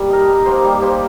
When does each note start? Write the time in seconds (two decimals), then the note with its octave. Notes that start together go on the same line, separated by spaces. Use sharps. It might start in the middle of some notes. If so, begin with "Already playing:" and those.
Already playing: G3 A#3
0.10 D#4 A#4
0.27 G3
0.46 A#3 G4 C5
0.64 G3
0.82 A#3 G4 C5